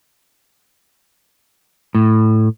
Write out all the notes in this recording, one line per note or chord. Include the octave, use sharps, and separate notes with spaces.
A2